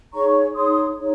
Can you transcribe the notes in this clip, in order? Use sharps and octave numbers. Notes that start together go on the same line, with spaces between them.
D#4 G#4 C#5 A#5 C#6
D#4 G#4 C#5 C6 D#6
D#4 G#4 C#5